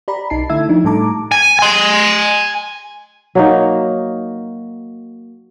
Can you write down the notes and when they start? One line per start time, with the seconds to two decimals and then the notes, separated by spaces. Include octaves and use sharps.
0.08 G4 D5 A#5 B5
0.30 B1 D#4 A5 C7
0.49 D3 A3 E4 E5 E6 G#6
0.69 F3 D4 D#4
0.84 A2 G3 A3 A5 A#5 D6
1.32 G#5
1.59 G#5 C6
3.35 F#3 A#3 D#4